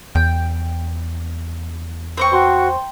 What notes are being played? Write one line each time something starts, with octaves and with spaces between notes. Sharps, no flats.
E2 G5
C4 B4 C5 G5 C#6
F#4 A#5 C6